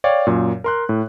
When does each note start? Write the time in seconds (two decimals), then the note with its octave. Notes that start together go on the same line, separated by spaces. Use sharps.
0.04 C#5 D5 F5 G5
0.27 F#2 A#2
0.64 A#4 C6 F#6
0.89 A2